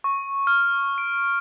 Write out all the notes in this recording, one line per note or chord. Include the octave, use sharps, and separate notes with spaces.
C#6
F6
D7